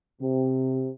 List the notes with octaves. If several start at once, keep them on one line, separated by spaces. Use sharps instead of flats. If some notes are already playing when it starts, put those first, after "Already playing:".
C3